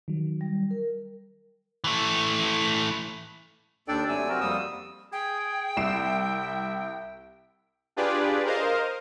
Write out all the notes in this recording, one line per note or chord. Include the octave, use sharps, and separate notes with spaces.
D#3 F#3
G3
A#4
E3 A3
D#2 D4 A4 D5 G5
C3 F#3 A3 D5 G#5 E6
C4 F#4 A#4 G5
F2 G3 A#3 D#6 E6
G#4 G5
C2 E5 C7 E7
D4 F4 G4 G#4 B4 D5
A#4 C5 D#5 F5